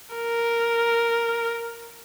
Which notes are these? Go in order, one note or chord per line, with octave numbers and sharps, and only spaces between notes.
A#4